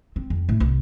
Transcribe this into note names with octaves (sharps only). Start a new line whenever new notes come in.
C4
F2
A2
C2